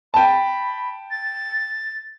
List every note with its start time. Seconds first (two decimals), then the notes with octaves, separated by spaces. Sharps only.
0.14 G5 A5 B5
1.11 A6